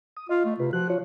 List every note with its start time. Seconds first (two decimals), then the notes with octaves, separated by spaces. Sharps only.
0.17 D#6
0.29 F4 D#5
0.46 A3
0.60 C3 F4 B4
0.73 F3 F#4 F#6
0.90 F4 C#5